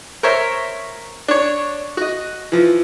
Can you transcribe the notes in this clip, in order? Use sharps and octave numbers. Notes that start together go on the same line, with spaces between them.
A#4 C5 C#5 E5
D4 C#5
F#4 D#5
E3 F3